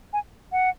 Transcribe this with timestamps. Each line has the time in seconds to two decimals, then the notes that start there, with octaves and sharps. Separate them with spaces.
0.13 G#5
0.52 F#5